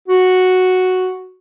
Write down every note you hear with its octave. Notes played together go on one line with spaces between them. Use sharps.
F#4